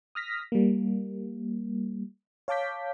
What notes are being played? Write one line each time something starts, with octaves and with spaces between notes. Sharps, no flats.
D#6 F6 A#6 B6
G3 A#3
C#5 F5 A5 D6 G6 B6